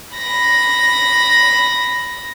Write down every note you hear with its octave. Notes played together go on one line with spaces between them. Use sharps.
B5 A#6